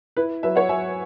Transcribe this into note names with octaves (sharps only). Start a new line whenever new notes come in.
E4 B4
F#3 B4 E5
C#5 F#5
F#3 E5 G#5